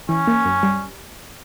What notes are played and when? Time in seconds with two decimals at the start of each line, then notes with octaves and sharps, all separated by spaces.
0.09 E3 C#4
0.27 A#3
0.45 F#2
0.63 G3